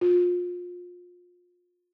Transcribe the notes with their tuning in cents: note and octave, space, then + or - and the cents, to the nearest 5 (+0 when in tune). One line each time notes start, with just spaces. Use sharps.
F4 +25